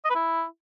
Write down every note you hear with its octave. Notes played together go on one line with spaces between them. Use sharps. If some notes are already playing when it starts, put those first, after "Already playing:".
D#5
B4
E4